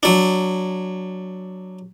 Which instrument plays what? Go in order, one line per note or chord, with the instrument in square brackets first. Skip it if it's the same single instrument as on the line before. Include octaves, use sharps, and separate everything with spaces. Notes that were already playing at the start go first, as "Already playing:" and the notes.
[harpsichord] F#3 D4